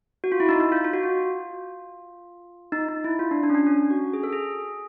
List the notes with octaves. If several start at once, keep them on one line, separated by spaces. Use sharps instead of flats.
F#4
F4
E4
D#4
D#4
F4
F4
F#4
F4
D#4
D#4
E4
F4
D4
D4
C#4
D4
C#4
F#4
G#4
A4
G#4